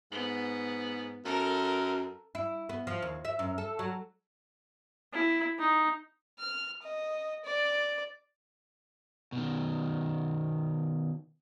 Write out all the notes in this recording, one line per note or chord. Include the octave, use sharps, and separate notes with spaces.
G#2 B3
F#2 A4 A#4
E4
B3
F3
D#2
E5
F#2
A4
F#3
E4
D#4
F6
D#5
D5
B2 D#3